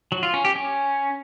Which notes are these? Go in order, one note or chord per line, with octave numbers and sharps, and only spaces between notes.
F#3
F4
C#4
G4
C#4